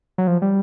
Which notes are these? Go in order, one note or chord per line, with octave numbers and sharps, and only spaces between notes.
F#3
F3
G3